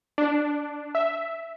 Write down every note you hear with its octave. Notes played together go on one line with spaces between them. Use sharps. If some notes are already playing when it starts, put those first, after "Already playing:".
D4
E5